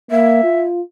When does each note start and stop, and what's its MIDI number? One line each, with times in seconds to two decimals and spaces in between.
0.11 0.44 58
0.11 0.61 76
0.44 0.81 65